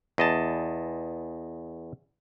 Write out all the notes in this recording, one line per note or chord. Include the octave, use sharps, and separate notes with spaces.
E2 D#5 A5